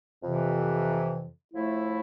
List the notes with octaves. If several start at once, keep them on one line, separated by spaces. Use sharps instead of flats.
F2 C3 E3
A2 F3 A3 E4